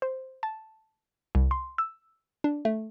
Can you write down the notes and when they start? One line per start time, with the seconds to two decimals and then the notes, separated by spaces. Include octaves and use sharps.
0.02 C5
0.43 A5
1.35 C2
1.51 C6
1.78 E6
2.44 D4
2.65 A3